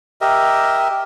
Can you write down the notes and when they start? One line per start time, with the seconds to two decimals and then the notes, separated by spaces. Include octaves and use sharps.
0.21 G4 A#4 D#5 E5